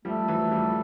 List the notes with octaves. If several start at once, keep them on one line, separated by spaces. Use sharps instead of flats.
F3 G3 A3
E3 F#3
F3 G3